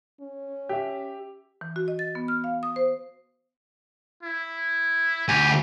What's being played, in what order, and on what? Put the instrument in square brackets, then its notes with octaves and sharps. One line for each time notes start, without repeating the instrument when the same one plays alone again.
[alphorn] C#4
[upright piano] G4 E5
[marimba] E3
F#4
D#5
A6
B3
F6
F5
D#6
C5
[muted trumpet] E4
[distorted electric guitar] D2 G#5 [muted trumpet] G4